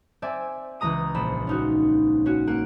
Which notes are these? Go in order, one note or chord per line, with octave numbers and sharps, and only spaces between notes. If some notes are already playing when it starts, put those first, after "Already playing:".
C4 D5 E5 G#5
C#2 E3 G#3 A#5 D#6 D#7
A#1 B5 E7
C#4 D#4 F#4
C#4 F#4
A#3 F#5 D7